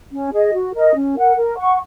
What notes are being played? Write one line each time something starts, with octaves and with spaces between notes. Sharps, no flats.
C#4
G#4 D#5
F#4
A#4 D#5
C#4
A#4 F#5
A#4
F#5 C#6